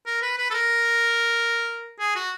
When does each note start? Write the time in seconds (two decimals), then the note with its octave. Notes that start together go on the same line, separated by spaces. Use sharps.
0.06 A#4
0.22 B4
0.38 B4
0.50 A4
0.54 A#4
1.99 G#4
2.16 F#4